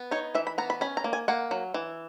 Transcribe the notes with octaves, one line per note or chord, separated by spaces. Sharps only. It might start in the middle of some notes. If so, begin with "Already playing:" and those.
Already playing: B3
D#4 C#5
E3 E5
B5
B3 A#5
B5
C#4 B5
A#5
A#3
G#5
A#3 F#5
F#3
E3